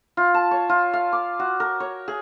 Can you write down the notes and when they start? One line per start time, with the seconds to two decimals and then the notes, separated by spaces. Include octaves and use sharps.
0.17 F4
0.34 A5
0.51 C#5
0.69 F4
0.93 F5
1.13 D6
1.39 F#4
1.60 A#4
1.80 C#5
2.08 G#4